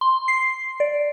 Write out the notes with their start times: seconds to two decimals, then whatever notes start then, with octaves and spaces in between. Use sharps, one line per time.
0.01 C6
0.28 C7
0.80 D5